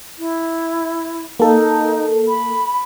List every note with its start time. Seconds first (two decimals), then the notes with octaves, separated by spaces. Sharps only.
0.18 E4
1.40 A#3 D#4 A4
2.28 B5